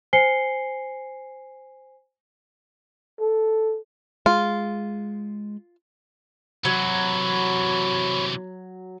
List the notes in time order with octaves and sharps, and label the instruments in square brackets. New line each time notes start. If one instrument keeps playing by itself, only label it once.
[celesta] C5 G#5 C7 C#7 G7
[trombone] A4
[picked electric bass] G#3 [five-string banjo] F4
[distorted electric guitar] C3 E3 [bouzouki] F#3 [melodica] C#5 B5